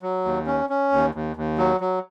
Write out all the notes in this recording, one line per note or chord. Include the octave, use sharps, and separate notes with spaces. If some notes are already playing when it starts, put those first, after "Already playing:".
F#3
D#2
C#4
C#4
D#2
D#2
D#2
F#3
F#3